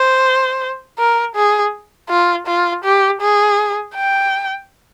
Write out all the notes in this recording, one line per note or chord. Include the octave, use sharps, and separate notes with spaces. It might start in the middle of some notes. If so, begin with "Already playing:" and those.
Already playing: C5
A#4
G#4
F4
F4
G4
G#4
G5